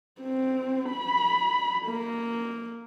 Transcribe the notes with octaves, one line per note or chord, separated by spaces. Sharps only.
C4
B5
A#3